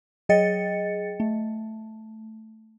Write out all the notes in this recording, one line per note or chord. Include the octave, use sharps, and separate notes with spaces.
F#3 G#4 D#5 G5 A6 C#7
A3